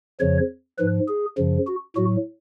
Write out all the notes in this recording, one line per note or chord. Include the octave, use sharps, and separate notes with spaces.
F2 C#3 F3 C#5
G#2 F3 B4
G#4
F#2 C#3 F3
F#4
A2 F#3 F#4